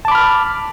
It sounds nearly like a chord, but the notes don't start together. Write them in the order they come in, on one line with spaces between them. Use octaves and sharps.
A5 D6 B5 F6